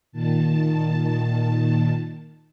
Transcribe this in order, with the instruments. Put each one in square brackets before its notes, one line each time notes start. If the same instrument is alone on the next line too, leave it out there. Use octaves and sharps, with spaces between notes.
[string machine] A#2 D#3 A5